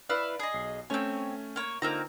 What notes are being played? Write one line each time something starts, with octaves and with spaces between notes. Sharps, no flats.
E4 B4 D5 F5
G#4 D#5
B1 C7
A3 C4 C#4 C#5 G#5
A#3 C#5
D3 A#3 C4 D#4 F4 A#5